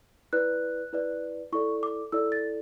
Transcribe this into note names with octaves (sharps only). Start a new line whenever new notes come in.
E4 B4 D5 F#6
E4 B4 D5
E4 A4 D5 C#6
D6
E4 A4 D5 E6
A6